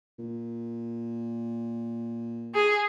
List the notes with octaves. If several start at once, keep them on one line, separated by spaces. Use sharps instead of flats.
A#2
G#4